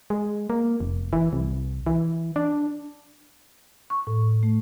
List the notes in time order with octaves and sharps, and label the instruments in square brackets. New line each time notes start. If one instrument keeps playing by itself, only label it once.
[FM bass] G#3
A#3
F1
E3
C2
E3
D4
[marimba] C#6
A2
A3